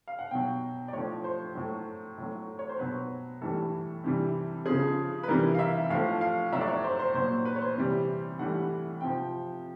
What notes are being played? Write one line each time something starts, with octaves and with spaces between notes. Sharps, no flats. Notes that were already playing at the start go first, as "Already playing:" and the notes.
F5
F#5
B2 F#3 G5
D5
A2 F3 C#5
C5
A2 F#3
A2 F#3
C#5
C5
B2 F#3 B4
A2 E3 G3 A4
C3 E3 G3
C#3 F3 G#4
B4
C3 E3 G3 A#4
F5
E5
A2 F3 F5
F5
A2 F#3 E5
D5
C#5
C5
C5
A#2 F#3 C5
B4
C#5
C5
C3 E3 G3
A2 E3 G3 F#5
C3 F3 G5